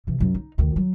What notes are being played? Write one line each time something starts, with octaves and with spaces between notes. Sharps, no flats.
C3 E3
F#2 F#3
D#4
D2 D#3
F#3